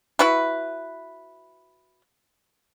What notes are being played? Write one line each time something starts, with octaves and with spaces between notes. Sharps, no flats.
E4 F#4 B4